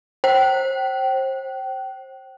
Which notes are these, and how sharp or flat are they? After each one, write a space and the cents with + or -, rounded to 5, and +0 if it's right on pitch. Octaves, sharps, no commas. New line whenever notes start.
C5 +30 G5 -30